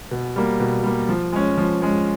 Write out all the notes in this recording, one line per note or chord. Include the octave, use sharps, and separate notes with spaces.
B2
G3 A#3
B2
G3 A#3
F3
G#3 C#4
F3
G#3 C#4